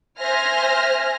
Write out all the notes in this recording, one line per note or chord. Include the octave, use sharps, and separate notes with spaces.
C5 E5 G#5 F6 A#6